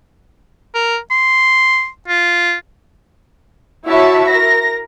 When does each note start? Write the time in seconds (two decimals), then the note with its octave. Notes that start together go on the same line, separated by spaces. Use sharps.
0.75 A#4
1.11 C6
2.08 F4
3.86 E4 F#4 C#5 E5 A5
4.30 A#4 A#6